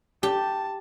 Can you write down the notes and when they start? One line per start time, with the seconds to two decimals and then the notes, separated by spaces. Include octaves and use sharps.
0.23 G4 A5